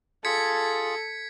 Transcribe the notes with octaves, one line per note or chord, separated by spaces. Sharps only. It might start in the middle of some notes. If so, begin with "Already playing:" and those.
F4 G#4 A4 G#6 B6 C#7